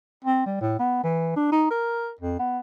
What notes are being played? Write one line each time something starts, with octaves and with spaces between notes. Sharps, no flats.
C4
G3
A2
B3
E3
D4
D#4
A#4
F2
B3